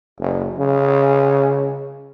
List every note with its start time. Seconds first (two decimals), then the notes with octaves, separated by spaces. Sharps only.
0.19 F#1
0.58 C#3